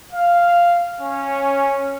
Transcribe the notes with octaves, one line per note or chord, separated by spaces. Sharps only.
F5
C#4